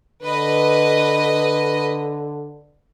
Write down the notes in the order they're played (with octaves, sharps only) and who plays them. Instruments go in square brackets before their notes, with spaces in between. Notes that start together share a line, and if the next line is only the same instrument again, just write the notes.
[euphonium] D3 [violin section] B4 D#5